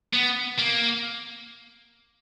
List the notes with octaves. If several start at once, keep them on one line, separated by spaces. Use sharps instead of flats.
B3
A#3